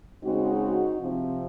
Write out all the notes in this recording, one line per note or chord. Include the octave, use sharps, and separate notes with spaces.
C#3 G#3 C4 D#4 F#4
C3 F3 C4